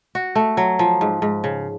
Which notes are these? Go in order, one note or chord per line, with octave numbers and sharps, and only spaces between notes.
F#4
A3
F#3
F3
G#2
G#2
C#3